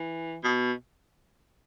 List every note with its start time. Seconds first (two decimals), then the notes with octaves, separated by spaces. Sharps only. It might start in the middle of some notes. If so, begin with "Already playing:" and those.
Already playing: E3
0.43 B2